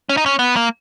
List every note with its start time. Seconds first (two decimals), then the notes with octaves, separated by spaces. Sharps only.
0.09 C#4
0.17 D#4
0.26 C#4
0.39 B3
0.56 A#3